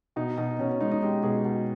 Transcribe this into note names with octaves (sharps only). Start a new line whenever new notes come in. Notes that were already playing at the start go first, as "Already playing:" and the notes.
B2 D#4
B2 D#4
B2 C#4
C#4
G#3 D#4
D#4
G#3 G4
B2 G#4
B2